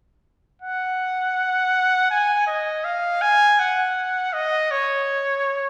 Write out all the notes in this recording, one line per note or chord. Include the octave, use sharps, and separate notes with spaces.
F#5
G#5
D#5
F5
G#5
F#5
D#5
C#5